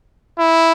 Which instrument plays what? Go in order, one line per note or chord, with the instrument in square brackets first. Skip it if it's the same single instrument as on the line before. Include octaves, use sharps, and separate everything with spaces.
[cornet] E4